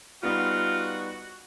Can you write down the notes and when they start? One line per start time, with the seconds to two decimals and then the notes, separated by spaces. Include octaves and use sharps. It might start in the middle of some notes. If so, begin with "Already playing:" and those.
0.23 G3 B3 D#4 F4 F#4